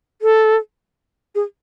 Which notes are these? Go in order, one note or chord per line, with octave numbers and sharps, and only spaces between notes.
A4
G#4